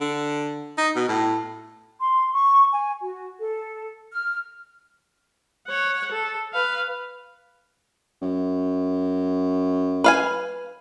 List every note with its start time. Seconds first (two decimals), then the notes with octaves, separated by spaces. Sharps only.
0.01 D3
0.78 D#4
0.96 B2
1.08 A2
2.01 C6
2.33 C#6
2.73 G#5
3.02 F#4
3.39 A4
4.11 F6
5.67 C#5 F#5
6.12 A4
6.53 B4 F5
8.22 F#2
10.04 B4 F5 G#5